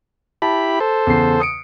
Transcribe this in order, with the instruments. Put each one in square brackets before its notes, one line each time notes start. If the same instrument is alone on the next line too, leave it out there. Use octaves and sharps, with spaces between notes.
[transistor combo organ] E4 G4 B5 [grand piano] A5
[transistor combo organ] A4 C5
[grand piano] E2 C#3 C7
D#6 C#7 D7